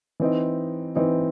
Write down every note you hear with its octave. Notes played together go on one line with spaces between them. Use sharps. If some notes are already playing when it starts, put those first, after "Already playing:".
E3 C4 D#4
E3 C4 D#4